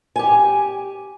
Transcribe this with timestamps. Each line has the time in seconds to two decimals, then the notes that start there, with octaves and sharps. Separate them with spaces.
0.16 G4 G#5